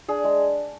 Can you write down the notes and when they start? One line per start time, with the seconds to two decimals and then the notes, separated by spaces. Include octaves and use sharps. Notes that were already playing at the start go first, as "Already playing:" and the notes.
0.08 D4 G#4
0.24 G#3